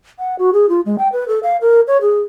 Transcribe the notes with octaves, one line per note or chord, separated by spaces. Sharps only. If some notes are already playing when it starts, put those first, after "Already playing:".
F#5
F#4
G#4
F4
G#3
G5
B4
A4
F5
A#4
C#5
G#4